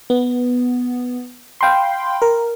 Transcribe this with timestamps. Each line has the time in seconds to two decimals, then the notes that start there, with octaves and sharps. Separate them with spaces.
0.10 B3
1.61 F5 G5 B5 C6
2.22 A#4